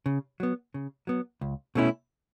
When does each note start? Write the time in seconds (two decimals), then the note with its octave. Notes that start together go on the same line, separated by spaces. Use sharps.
0.06 C#3
0.40 F#3 B3
0.74 C#3
1.07 F#3 B3
1.41 C#2
1.75 B2 A3 C#4 E4